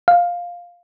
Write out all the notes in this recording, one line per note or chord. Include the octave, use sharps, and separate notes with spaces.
F5